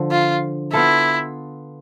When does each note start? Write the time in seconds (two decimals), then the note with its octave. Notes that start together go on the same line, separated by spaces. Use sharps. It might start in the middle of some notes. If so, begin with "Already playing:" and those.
Already playing: D3 F3
0.11 F4
0.73 B3 E4 F4 A4